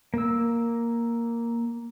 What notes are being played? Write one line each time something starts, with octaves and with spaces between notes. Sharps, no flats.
A#3 E6